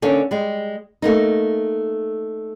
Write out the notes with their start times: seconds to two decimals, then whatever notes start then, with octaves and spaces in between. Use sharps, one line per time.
0.02 D3 A#3 C#4 D4
0.31 G3 G#3
1.02 A3 A#3 D#4